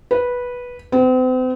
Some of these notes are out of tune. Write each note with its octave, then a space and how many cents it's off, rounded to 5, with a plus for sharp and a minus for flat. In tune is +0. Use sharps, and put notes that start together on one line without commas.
B4 -10
C4 -40